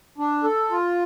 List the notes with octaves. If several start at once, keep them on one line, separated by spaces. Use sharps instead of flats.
D4
A4
F4